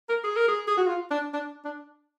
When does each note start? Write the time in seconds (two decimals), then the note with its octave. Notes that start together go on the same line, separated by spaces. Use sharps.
0.09 A#4
0.24 G#4
0.36 A#4
0.48 G#4
0.67 G#4
0.77 F#4
0.87 F4
1.11 D4
1.34 D4
1.65 D4